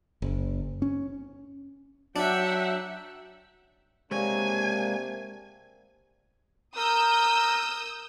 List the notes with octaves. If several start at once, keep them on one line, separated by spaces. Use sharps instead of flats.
F#1
C#4
F#3 D4 E5 F#5 G5
C3 G#3 A#3 D4 C#5 G#5
A#4 D#6 E6 G6